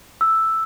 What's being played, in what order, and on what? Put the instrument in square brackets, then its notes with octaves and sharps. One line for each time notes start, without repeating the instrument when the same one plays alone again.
[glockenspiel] E6